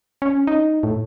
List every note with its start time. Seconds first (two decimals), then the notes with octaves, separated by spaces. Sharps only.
0.22 C#4
0.47 D#4
0.83 A2